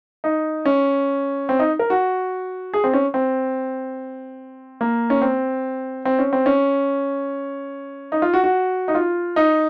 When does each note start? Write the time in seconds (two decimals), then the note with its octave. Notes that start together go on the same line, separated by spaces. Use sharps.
0.24 D#4
0.65 C#4
1.49 C4
1.59 D#4
1.79 A#4
1.90 F#4
2.74 G#4
2.84 C4
2.94 C#4
3.14 C4
4.81 A#3
5.10 C#4
5.22 C4
6.05 C4
6.19 C#4
6.33 C4
6.46 C#4
8.12 D#4
8.22 F4
8.33 F#4
8.44 F#4
8.88 D#4
8.95 F4
9.36 D#4